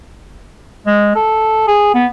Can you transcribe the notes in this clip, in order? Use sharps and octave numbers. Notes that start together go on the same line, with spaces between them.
G#3
A4
G#4
B3